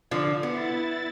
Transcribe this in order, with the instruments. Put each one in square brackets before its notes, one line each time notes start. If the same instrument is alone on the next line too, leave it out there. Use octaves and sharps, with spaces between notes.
[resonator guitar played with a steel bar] D3 F3
[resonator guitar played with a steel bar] B3 [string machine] E4 A6